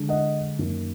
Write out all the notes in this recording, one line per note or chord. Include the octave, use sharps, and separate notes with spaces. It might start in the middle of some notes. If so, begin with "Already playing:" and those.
Already playing: D3 G#3 D4
D#5 F#5
F#2 D#3 A#3